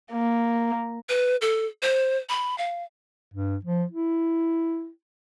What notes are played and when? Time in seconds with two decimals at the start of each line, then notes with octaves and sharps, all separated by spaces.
0.12 A#3
1.09 B4
1.41 A4
1.83 C5
2.29 B5
2.58 F5
3.34 G2
3.64 F3
3.91 E4